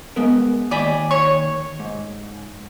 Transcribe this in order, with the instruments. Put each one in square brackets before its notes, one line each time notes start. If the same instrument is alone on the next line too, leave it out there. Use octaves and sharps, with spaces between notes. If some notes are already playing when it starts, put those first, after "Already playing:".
[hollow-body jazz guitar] G#3 B3 A#4
[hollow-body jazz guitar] D#2 G#5 B5 [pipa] D5
[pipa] C#5
[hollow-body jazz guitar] G#2